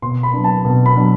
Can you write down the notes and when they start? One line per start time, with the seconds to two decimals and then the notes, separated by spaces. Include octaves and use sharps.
0.02 B2 C6
0.23 B5
0.34 F#3 B3 D4
0.44 A5
0.65 B2
0.86 B5
0.96 F#3 B3 D4